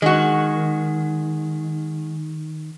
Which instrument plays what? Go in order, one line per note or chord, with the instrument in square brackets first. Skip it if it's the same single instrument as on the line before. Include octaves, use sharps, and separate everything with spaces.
[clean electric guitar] D#3 [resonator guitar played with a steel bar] G#3 F#4